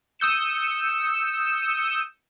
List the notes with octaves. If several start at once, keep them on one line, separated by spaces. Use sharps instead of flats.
D#6 E6 G6 C#7 E7